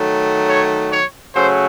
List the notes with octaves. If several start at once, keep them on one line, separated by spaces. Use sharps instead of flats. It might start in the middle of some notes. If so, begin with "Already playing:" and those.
Already playing: D#3 F#3 A3
C#5
C#5
C#3 F#3 A3 C5